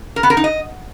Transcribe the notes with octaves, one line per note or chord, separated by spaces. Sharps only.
A#4
B3
A#4
D#4
D#5